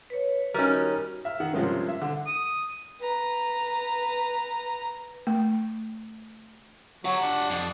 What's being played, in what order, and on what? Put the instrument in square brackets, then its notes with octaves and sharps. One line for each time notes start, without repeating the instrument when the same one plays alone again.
[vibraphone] B4 C#5
[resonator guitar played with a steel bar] G3 C#4 [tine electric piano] D#4 A#4 [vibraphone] F#4 G4
[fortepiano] E5 F6
D#3 F#5
G2 C3 F3 G#3 A#3 C#4
E5
D3
[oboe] D#6
[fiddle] B4 A#5
[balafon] A3
[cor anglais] F#3 [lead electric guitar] G4 F#5
[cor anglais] D4
[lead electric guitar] F2